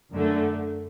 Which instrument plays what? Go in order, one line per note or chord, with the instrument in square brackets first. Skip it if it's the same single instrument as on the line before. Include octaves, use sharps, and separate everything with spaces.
[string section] F#2 D3 A3